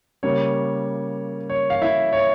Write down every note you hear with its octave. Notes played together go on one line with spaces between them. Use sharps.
C#3 G3 A#3 C#5
C#5
F5
E4 E5
C#5